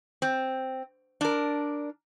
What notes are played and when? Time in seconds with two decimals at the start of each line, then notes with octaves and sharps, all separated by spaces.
0.22 C4
1.21 D4 A#4